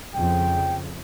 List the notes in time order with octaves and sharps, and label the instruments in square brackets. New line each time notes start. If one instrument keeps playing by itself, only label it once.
[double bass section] F2 C#3 [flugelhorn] G5